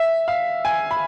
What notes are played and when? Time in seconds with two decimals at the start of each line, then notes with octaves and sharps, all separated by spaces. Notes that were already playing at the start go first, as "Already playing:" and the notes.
Already playing: E5
0.28 F5
0.65 G#5
0.91 B5